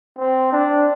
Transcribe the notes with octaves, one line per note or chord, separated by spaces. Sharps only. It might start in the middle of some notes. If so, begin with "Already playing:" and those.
C4
D4